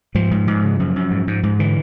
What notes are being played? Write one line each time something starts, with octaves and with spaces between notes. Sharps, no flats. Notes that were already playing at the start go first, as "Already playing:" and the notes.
G#2 F3
G#2
G#2
C#3
F#2
F#2
G#2
G#2
G#2
D3 E3